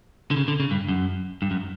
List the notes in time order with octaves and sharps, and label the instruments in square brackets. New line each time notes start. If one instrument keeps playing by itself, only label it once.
[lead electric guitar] D3
C#3
D3
C#3
G2
F#2
G2
F#2